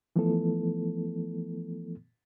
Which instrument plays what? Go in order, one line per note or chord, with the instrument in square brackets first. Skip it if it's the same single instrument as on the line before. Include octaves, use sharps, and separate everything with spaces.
[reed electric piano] E3 F3 A3 B3 E4 A4